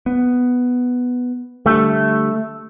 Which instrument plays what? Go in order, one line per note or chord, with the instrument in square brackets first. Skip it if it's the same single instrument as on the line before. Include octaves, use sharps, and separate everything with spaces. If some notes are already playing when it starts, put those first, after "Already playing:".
[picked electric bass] B3
[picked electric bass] D3 G3 [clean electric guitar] A3